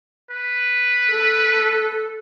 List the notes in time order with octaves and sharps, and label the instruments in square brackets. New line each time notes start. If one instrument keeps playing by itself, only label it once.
[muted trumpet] B4
[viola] A4